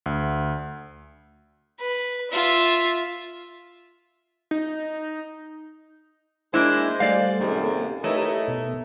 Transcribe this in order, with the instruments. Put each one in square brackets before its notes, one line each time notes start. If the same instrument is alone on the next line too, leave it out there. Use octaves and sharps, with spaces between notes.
[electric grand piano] D2
[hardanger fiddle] B4
F4 E5
[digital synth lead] D#4
[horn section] G#3 C5 [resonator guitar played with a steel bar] A#3 D4 E4
[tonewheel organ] G3 A3 [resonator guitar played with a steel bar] D5 F5
[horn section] F#2 C3 D#3 [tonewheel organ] A#3 G#4 A4
[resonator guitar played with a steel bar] A3 [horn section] D#4 E4 C#5 [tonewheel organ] G4 A#4 B4
[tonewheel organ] B2